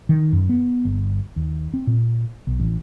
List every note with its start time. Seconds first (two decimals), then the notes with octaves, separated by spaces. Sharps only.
0.09 D#3
0.33 F#2
0.49 B3
0.85 G1
1.36 D#2
1.74 C4
1.87 A#2
2.47 B1
2.60 A1